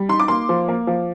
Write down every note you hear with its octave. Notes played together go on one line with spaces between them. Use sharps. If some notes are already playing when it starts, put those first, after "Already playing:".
Already playing: G3
D#4 C6
D6
A#3 C6
F3
A#3
F3